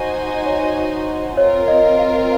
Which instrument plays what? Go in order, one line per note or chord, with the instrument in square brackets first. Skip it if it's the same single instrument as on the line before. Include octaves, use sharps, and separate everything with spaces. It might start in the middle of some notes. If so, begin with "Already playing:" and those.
Already playing: [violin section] D#4 F#4 C5 D#5 G#5
[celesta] C#5
[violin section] C4 F4 A#4 [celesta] C#5
[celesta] D#5
F5